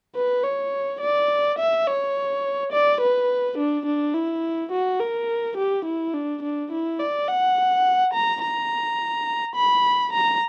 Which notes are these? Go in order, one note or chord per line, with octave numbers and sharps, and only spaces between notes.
B4
C#5
D5
E5
C#5
D5
B4
D4
D4
E4
F#4
A#4
G4
E4
D4
D4
E4
D5
F#5
A#5
A#5
B5
A#5